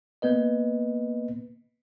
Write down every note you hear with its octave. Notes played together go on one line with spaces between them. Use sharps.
A#3 B3 B4 D#5